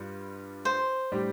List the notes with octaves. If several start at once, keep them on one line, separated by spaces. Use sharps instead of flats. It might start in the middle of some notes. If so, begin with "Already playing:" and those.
Already playing: G2 G3 F4
C5
A2 G3 D4 G4